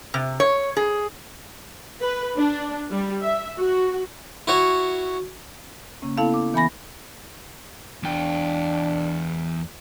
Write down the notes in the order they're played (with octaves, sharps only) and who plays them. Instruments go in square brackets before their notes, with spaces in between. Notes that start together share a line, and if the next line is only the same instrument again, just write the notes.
[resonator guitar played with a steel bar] C3
C#5
G#4
[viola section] B4
D4
G3
E5
F#4
[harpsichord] E4 F#4 C#5
[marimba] C#3 A#3 C#4
B3 E4 A4 F5 A5
D6
E3 B3 G#5 B5 A#6
[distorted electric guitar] E2 G5 [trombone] D4